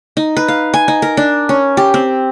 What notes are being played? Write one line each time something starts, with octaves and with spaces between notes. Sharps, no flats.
D#4
B4
F5
G#5
D#4
A#4
D4
C#4
G4
C4